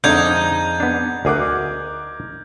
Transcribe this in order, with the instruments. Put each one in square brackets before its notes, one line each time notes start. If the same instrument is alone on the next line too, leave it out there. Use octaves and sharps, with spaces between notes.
[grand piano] F2 G#3 [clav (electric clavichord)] D3 A3 D4 [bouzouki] D#4 [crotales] G6 G#6
[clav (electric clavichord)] B3 D4
[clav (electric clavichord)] D2 G#4 F#5 [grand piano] A#4 D6 F#6